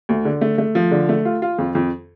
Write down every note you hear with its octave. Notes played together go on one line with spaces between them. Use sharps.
D2
D3
A3
A3
F3
D3
A3
F4
F4
F2
F2